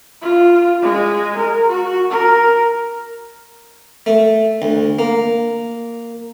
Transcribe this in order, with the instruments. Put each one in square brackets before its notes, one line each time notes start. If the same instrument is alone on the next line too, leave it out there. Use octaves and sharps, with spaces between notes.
[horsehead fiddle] F4
G#3
A#4
F#4
A#4
[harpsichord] A3
D2
A#3